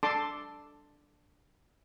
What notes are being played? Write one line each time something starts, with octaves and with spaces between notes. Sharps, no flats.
D4 A4 A5 C6 D6